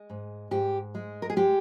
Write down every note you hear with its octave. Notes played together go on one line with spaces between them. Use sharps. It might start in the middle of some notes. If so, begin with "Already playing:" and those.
Already playing: G#3
G#2
G#2 G4
G#3
A#4
G#4
G#3 G4